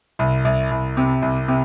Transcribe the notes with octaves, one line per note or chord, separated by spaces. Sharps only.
C2
C2
C2
C3
C2
C3